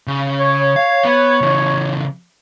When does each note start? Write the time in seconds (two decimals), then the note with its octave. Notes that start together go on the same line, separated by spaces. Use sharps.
0.07 C#3
0.39 C#5
0.76 F5
1.05 B3
1.41 C#3 E3